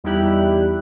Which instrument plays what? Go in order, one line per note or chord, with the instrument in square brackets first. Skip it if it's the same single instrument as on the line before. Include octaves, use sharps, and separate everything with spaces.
[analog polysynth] E2 G3 D#4 E4 G4 F#6